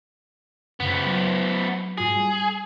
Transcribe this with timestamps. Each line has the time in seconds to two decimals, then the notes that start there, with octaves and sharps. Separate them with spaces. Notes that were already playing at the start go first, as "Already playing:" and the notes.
0.80 F#2 C#3 F3 B3
1.06 F#3
1.98 G#2 F4 F#4 G#4
2.16 G3